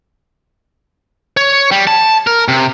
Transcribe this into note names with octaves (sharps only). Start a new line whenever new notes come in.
C#5
G3
A5
A#4
C3